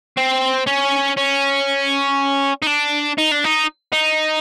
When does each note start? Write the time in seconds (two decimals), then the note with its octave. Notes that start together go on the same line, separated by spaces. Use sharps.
0.17 C4
0.67 C#4
1.17 C#4
2.62 D#4
2.67 D4
3.18 D#4
3.31 D4
3.44 D#4
3.93 D#4